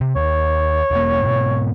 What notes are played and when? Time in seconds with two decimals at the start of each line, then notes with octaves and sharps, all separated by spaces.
0.01 C3
0.16 D#2 C#5
0.91 E1 A#3
1.23 G#2 B2